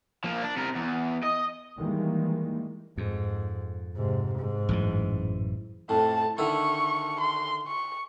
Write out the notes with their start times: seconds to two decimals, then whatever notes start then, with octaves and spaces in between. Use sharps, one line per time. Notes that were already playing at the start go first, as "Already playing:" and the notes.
0.24 F3 A#3
0.42 D4
0.56 C3 A#4
0.76 E2
1.24 D#5
1.78 D#3 E3 G3 G#3 A#3
2.98 F2 G#2
3.96 G#2 C3
4.38 G#2
4.69 A1 F#2 E3
5.89 F2 A2 A5
6.38 D3 D#3 E4 C#6
7.20 C6
7.67 C#6